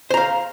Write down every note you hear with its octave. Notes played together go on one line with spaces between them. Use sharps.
C5 F5 A#5